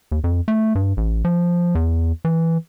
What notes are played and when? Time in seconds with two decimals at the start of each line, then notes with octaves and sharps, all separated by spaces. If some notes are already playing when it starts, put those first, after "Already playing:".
0.12 D#2
0.24 F2
0.48 A3
0.75 G2
0.97 A1
1.25 F3
1.75 E2
2.25 E3